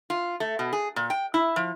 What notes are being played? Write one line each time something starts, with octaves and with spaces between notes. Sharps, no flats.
F4
A3
B2
G#4
A#2
G5
E4
F3